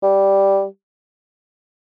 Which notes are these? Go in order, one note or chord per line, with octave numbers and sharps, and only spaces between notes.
G3